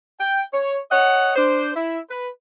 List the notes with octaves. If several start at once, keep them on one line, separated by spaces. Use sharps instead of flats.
G5
C#5
C#5 D#5 F#5
D4 C5
E4
B4